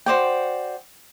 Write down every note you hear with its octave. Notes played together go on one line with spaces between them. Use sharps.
F#4 C5 D5 G5